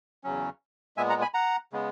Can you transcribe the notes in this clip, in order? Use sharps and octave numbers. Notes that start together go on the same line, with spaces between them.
E2 C#3 F#3 C#4
A#2 G#3 B3 E5 G#5
F#5 A#5
G#5 B5
F#5 A#5
C#3 G#3 B3